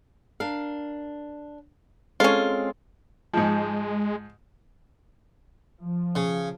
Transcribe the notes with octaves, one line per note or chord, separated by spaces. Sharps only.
D4 A#4 F5
G#3 C4 C#4 F4 A4
G#2 F3 G#3
F3
C#3